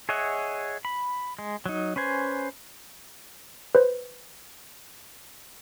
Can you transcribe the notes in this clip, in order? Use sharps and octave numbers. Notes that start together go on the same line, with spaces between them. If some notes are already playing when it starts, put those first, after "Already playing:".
G#4 C#5 D#5 E5 F#5
B5
G#3
F#3 D#4
C#4 B4 C5 G#5
B4 C5